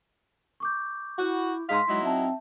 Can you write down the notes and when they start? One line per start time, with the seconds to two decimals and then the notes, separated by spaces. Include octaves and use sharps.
0.60 C#6 D6 G6
1.18 E4 F#4
1.69 G#2 G#3 F5 C6 B6
1.88 F#3 G#3 D#4 E4
2.04 C4 E5 A5